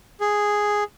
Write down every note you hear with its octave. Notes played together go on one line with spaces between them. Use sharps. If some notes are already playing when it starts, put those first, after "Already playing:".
G#4